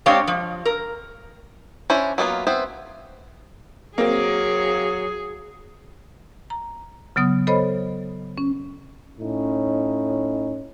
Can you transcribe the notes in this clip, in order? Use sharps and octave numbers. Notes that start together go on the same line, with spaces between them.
G#3 C4 D4 G4 C#5 F5
F3
A#4
C#4 D4 E4 C5
F#3 A#3 B3 F4
B3 C4 E4 C5
F#3 A#3 C4 G#4
A#5
C#3 F#3 B3 D#6
A4 C5 C#5 D#5 B5
C#4
A2 C#4 D#4